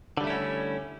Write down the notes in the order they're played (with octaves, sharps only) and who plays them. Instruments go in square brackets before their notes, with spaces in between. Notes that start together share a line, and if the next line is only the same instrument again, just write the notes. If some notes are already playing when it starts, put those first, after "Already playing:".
[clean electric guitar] D3
G3
A3
E4
C#4